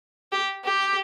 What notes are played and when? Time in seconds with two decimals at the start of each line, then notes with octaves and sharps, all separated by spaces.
0.32 G4
0.65 G4